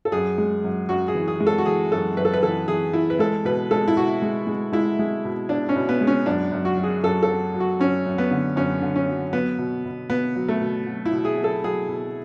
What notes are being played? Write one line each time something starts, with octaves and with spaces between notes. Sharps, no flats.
A4
F#2 G#4
G#3
F#2
F#2 F#4
G#4
E3
G#4
G#3
A4
F#4
E3 G#4
F#2 A4
F#2 B4
A4
B4
E3 A4
E3 G#4
E3 E4
B4
G#3 A4
B2 B4
G#3 A4
E4
B2 F#4
G#3
G#3
G#3 E4
G#3
B2
B2 D4
C#4
B2
B3
G#3
C#4
F#2 D4
F#2
F#4
F#3
G#4
F#2 A4
A4
F#3
F#3
F#4
F#2 C#4
F#2
B3
D3
F#2 C#4
D3
C#4
F#3
F#3 B3
B2
B2
B2 B3
F#3
A3
B2
F#3
E4
B2
G#4
F#3
A4
F#3 G#4
B2